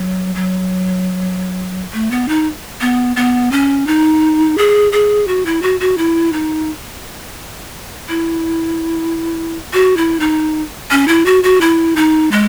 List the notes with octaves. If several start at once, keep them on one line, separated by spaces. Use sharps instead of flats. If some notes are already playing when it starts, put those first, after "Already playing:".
Already playing: F#3
F#3
A3
B3
D#4
B3
B3
C#4
D#4
G#4
G#4
F#4
E4
F#4
F#4
E4
D#4
E4
F#4
E4
D#4
C#4
E4
F#4
F#4
E4
D#4
G#3